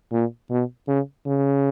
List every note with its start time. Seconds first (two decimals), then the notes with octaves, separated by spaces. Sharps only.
0.13 A#2
0.51 B2
0.88 C#3
1.26 C#3